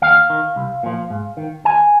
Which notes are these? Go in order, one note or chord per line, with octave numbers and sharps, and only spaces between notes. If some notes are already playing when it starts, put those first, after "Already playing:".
D#2 F5
D#3
C2
A#2 F3
G#2
D#3
D#2 G#5